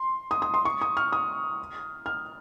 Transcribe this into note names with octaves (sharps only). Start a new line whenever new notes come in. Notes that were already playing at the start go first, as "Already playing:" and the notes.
Already playing: C6
D#6
D#6
C6
C#6
D#6
F6
D#6
F6